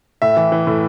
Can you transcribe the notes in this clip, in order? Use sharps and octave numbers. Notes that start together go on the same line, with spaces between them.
A2 E5
E3
E3
A2